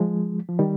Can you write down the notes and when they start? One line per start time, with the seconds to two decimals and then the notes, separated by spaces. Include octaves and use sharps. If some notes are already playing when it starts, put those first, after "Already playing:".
Already playing: F3 G#3
0.49 F3
0.59 D#3 G3